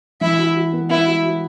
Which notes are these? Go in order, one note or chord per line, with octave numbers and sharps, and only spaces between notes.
E3 E4 E5
F#4
F#4
B3
B3 E4 E5
F#4
F#4